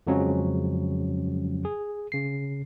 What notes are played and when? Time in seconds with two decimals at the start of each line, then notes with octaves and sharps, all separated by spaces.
0.07 F2 C#3 F3 F#3 G#3 C#4
1.65 G#4
2.12 C#3 C7